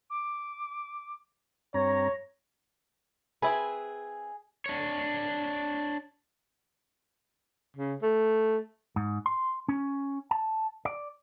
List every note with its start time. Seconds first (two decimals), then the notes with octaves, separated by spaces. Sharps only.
0.10 D6
1.74 G2 C4 C#5 A#5 A#6
3.42 C4 E4 G#4 B4
4.66 D4 C#5
7.77 C#3
8.02 A3
8.96 G#2
9.26 C6
9.68 C#4
10.31 A5
10.85 D5